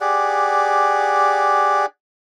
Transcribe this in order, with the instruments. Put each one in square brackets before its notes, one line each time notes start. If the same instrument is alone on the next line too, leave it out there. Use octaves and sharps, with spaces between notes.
[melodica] G4 G#4 D5 F#5